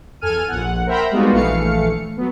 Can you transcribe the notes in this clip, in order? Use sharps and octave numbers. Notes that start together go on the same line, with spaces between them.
E2 A4 G#5 F6 D#7
A#1 F#5
A#4 C5 E5 G5 A#5 B5
G3 G#3 B3 D#4 F4 F#4
A#1 E3 A3 F5 C#7
F#3 B3